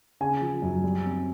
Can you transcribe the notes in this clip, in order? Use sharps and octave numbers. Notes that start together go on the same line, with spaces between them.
C#3 G#5
F3
F#2
G3
C4